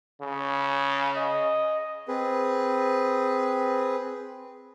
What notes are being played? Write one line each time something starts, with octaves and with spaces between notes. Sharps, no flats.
C#3
D#5
C4 G#4 B4